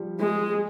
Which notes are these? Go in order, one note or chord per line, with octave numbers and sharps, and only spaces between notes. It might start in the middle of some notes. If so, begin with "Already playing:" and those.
Already playing: F3 G3
G#3
G#3